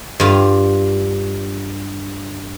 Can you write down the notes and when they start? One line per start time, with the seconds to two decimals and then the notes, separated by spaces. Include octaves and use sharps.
0.20 G2 F4